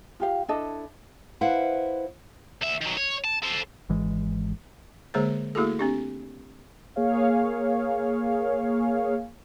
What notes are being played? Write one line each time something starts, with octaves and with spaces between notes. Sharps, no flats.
F4 G4 F5
D4 E4 A4 D#5
E4 B4 C5 F5 F#5
D2 E5
D#3 F#3
C#5
A5
A4 C5
G#1 E3 G#3
D3 G#3 A#3 G#4 C5 C#5
A3 A#3 E4 F#4 G#4 A4
C4 D4 G4
A#3 G#4 C#5 F5